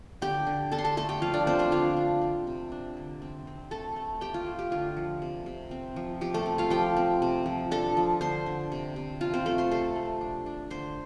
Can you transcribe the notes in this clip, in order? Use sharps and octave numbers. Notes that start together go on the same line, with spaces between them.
D3 G4 G5
D3
D4 A4 A5
C6
A4 A5
A3 A4 A5
G4 G5
F3 F4 F5
D4 D5
A3 C4 C5
D4 D5
D3 F4 F5
D4
C4
C3
D4
D3
C4
C4
A3 A4 A5
A3
A3 G4 G5
F4
A3
G4
D3 F4
F3
C3
C3
C4
F3
F3 G4
A3 A4
C4
F4 F5
F3 G4 G5
C4
C3
F3
D4 A4 A5
F3
D3 C5 C6
D3
C3
C3
F3 F4 F5
C4 C5
A3 C4 A4
C5 C6
C3 A4 A5
A3
D4
D4
D3 C5 C6